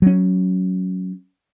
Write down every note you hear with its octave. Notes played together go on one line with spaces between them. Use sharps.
F#3 C#4